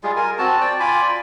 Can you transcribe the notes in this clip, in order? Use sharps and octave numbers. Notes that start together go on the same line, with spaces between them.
G3 G#3 F4 G#4
A#4 G#5
C4 F#4 A5
D5 G5
F4 G#5 B5 D6
D5